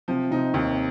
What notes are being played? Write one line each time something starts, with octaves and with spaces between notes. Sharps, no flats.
C3 F3 C4
C3 C4 D#4
D#2 C3 C4